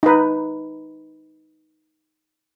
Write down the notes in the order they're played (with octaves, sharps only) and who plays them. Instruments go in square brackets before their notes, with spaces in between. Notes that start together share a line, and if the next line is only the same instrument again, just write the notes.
[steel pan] D#4 B4